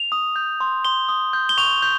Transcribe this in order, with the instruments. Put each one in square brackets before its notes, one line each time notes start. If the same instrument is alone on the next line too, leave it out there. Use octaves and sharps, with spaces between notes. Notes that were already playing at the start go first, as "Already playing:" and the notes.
Already playing: [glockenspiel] F7
D#6
G6
C6
C6 G7
D#6
G6
G7
C#6 F7
G6